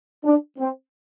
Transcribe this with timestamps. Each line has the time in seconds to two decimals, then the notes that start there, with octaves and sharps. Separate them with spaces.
0.24 D4
0.58 C4